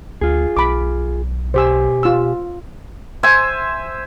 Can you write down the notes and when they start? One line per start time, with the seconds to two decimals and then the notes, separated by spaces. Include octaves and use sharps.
0.21 D2 F4 G#4
0.57 B1 B5 D6
1.54 B2 G4 C5 G#5 E6
2.03 F4 E6
3.23 C5 E5 G#5